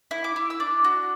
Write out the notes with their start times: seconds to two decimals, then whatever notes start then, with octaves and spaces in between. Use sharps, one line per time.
0.11 E4
0.24 D6
0.36 E4
0.50 E6
0.60 D4 D6
0.84 F#4